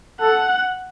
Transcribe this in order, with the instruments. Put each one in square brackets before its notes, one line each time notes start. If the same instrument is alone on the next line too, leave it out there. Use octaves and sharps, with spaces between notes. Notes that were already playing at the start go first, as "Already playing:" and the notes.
[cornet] A4 [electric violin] F#5